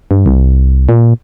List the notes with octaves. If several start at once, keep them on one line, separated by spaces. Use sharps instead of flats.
G2
C2
A#2